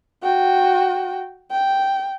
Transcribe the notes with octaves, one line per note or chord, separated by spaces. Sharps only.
F#4 G5
G5